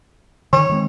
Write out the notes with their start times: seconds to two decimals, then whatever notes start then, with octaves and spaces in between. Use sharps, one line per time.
0.53 D3 D#3 C#5
0.69 D#3 G#3 C4